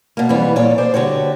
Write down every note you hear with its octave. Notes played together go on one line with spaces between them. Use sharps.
B2 A#3
F2 E3 G3 B3
A#2 A4 C#5 D5
G#4 C5 D5
G2 D3 F#4 G4 C#5